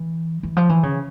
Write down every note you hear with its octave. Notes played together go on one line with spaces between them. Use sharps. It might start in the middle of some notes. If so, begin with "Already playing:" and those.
Already playing: E3
E3
F3
E3
C#3